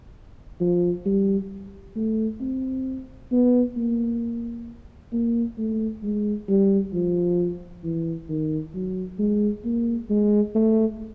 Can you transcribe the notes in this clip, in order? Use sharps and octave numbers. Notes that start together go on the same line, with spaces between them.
F3
G3
A3
C4
B3
A#3
A#3
A3
G#3
G3
F3
E3
D#3
F#3
G#3
A#3
G#3
A3